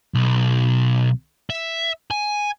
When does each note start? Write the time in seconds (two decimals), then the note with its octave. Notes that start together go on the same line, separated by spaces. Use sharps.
0.14 B1
1.50 E5
2.11 G#5